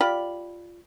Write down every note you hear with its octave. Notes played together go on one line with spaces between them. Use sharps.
F4 G4 D5 B5